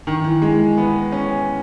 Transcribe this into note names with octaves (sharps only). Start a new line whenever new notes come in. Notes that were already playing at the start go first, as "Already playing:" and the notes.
D#3
E3
G#3
B3
C#4